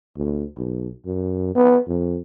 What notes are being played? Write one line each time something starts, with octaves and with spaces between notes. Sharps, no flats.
D2
B1
F#2
B3
F2